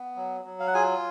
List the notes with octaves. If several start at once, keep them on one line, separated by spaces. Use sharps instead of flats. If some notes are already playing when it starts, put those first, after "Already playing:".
Already playing: B3
F#3
F#3
F5
F#5
F4 G#4 G#5